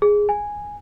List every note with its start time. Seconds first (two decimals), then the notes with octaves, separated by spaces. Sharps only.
0.02 G#4
0.29 G#5